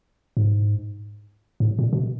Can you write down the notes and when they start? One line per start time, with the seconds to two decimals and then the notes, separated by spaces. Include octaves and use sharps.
0.37 G#2
1.60 G#2
1.64 A2
1.79 A#2
1.93 B2